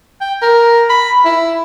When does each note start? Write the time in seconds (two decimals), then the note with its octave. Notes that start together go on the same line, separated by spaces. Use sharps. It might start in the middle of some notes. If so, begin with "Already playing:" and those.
0.21 G5
0.42 A#4
0.89 B5
1.25 E4